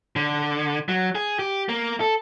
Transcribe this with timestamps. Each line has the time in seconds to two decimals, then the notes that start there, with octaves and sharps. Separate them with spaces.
0.16 D3
0.89 F#3
1.15 G#4
1.39 G4
1.69 A#3
2.00 A4